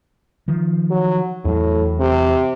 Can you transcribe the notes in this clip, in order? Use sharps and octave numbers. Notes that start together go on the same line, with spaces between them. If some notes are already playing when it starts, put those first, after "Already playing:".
D#3 F3
F#3
E2 A2 F#3
C3